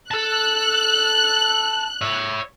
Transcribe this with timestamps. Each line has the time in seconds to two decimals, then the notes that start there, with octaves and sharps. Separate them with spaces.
0.11 A4 A5 F#6
2.02 C#5 E5